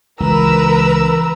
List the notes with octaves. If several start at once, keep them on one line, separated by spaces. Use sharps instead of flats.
C#2 E3 A#4 B4 A#5 E6